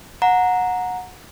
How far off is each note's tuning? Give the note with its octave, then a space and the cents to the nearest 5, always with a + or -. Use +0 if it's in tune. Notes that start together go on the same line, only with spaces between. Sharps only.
F#5 -20 A#5 +0